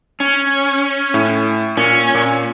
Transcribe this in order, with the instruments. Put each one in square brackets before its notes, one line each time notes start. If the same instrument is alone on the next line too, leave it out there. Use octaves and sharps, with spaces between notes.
[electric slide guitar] C#4
[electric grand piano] A2
[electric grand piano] A#2 [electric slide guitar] C#4
[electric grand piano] A#2